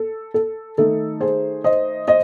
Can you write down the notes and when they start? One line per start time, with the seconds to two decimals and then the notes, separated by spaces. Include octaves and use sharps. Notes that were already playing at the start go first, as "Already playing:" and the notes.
Already playing: A4
0.34 A4
0.78 D#3 A3 D#4 A4
1.20 G#4 C5
1.64 C5 D#5
2.08 C5 D#5